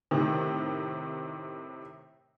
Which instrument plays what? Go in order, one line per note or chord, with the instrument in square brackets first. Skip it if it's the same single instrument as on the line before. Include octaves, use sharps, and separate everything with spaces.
[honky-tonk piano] A2 C3 D#3